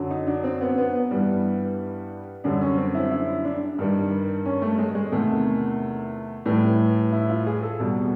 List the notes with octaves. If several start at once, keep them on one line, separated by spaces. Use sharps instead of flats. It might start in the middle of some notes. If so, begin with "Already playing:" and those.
Already playing: F#2 D3 F#3
D#4
D4
C4
B3
B3
B3
G2 E3 G3
F#2 D3 G3 D4
C#4
C4
E4
E4
D4
G2 D#3 G3
C#4
A3
G#3
G#3
E2 C3 D#3 A3
A2 E3 G3
E4
F4
G#4
A4
E2 B2 G3